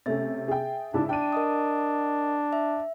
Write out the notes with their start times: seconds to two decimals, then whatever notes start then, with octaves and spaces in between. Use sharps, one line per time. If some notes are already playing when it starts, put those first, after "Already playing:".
0.06 C3 A3 C#4 E5 A6
0.48 G#4 G5
0.94 G#2 C#3 D4 E4
1.09 D4 G5 D#7
1.33 A#4 D#5 D#6
2.53 E5